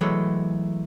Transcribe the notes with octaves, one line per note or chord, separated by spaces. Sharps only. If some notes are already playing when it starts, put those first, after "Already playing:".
E3 F#3 G#3 A3